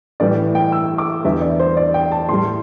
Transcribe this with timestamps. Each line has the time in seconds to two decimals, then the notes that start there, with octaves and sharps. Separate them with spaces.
0.20 A2 E3 G3 D5
0.55 G5
0.72 E6
0.98 D6
1.24 E2 D3 G3 E5
1.42 D5
1.60 C5
1.77 D5
1.94 G5
2.12 A5
2.29 A2 G3 C6